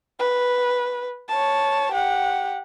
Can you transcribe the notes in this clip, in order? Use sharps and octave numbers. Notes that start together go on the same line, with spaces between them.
B4
C#5 A5
G4 F#5